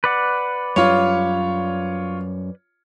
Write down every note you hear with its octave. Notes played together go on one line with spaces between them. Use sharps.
B4 D5 F#5
F#2 G3 F4 C#5